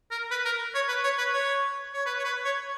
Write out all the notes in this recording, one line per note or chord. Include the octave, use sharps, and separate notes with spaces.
A#4
B4
A#4
C#5
B4
C#5
B4
C#5
C#5
B4
C#5
B4
C#5